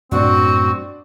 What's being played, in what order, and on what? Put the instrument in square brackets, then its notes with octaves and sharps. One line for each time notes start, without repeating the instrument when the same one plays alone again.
[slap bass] F#2 A2 B3 [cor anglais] C4 [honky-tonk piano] D4 D5 [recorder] F#4